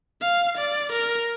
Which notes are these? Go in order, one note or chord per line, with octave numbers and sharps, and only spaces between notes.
F5
D5
A#4